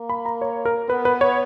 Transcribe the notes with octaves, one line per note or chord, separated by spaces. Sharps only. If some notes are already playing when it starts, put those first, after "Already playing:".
Already playing: A#3
B5
A#5
C#5
A#4
B3 B4
B4
C#5